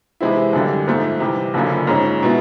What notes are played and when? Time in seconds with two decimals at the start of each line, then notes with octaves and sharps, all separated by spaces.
0.21 C3 E3 G#3 C4 E4
0.53 F#2 D3 G3 A#3
0.88 G#2 F3 A3
1.20 C3 E3 G3
1.54 F#1 F#2 D3 F3 A#3
1.87 G#2 F3 G#3 C#4
2.23 B2 G#3 B3 E4